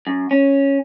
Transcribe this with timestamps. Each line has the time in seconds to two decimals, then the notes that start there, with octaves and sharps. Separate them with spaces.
0.07 F#2
0.31 C#4